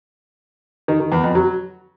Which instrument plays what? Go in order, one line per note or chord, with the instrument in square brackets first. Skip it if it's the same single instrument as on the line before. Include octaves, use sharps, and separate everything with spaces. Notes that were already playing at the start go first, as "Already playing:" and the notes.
[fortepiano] D#3
D#3
E2
F2
F#3